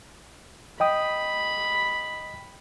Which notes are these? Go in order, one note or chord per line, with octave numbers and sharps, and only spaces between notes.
D#5 G5 B5 D#6